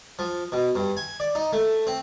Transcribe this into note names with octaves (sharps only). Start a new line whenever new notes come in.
F3
B2
G2
G#5
D5
D#4
A3
C4